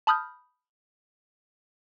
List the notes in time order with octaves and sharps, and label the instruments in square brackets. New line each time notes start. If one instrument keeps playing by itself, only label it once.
[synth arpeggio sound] A5 B5 D#6 F6 G6